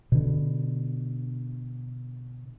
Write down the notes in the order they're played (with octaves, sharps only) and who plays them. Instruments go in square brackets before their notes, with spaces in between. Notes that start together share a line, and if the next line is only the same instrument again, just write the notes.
[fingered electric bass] B2 D3